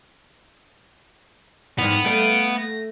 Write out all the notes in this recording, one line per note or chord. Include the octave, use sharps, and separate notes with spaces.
F2 G#2 E3 B3 F7
A3 A#4 F5 D7
A#6